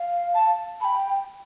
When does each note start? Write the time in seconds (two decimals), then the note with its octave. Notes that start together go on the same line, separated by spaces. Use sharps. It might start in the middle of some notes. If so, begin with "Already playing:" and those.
Already playing: F5
0.35 A5
0.80 G5 A5 B5